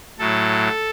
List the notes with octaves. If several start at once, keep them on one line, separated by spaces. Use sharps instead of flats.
A2 F#3 A4